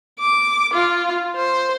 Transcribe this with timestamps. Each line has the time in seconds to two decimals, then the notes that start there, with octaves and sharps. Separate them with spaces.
0.19 D6
0.74 F4
1.36 C5